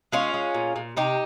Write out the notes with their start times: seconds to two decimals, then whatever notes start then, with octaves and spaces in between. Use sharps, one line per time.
0.12 G#3 C#4 F4
0.34 G#3
0.55 A#2
0.76 A#2
0.97 C3 D#4 G4